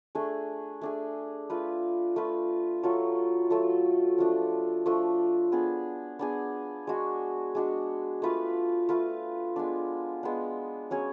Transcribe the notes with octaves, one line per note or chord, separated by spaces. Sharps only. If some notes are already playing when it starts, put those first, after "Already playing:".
A3 D4 G#4
A3 D4 G#4
A3 F4 B4
A3 F4 B4
F#3 A3 F4 A4
F#3 A3 F4 A4
F3 A3 D4
F3 A3 D4
B3 D4 G#4
B3 D4 G#4
G#3 D4 F#4
G#3 D4 F#4
A3 F4 B4 F5
A3 F4 B4 F5
G#3 B3 D4
G#3 B3 D4
F#3 C#4 G#4 C#5